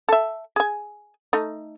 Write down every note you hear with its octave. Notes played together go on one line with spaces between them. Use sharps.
A4 E5
G#4 G#5
A3 D#4